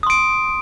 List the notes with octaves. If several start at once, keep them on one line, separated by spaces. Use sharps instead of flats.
C6 D#6 D7